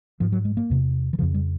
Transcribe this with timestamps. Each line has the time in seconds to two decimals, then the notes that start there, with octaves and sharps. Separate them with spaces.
0.20 G#2 F3
0.32 F#3
0.45 G#3
0.57 A#3
0.70 E2 C3
1.13 E3
1.19 C#3 F3
1.22 F2
1.34 G3